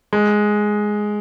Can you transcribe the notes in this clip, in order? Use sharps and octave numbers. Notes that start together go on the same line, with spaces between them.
G#3